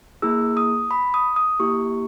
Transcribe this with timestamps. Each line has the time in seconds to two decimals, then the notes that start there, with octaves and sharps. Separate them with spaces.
0.22 A#3 E4 G#4 E6
0.57 D#6
0.91 B5
1.14 D#6
1.36 D#6
1.60 A#3 E4 G4 C#6